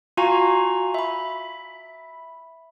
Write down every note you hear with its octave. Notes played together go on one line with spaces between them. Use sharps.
F4 F#4 F5 G#5 A#5 C#6
E5 B5